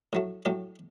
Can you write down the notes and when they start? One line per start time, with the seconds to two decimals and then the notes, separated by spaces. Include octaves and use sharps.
0.13 A2 F#3 A3
0.45 A2 F#3 A3 G4